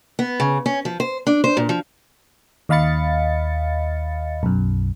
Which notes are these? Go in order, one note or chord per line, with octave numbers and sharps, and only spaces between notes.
B3
C#3
C#4
F3
C5
D4
C5
A#2
F3
D#2 D#5 F5 B5 A6 C#7
B1 F#2